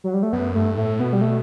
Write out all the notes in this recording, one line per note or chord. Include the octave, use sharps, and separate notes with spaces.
F#3
G3
A3
F#2 B3
G2 A3
A2 A3
B2 B3
G3
A3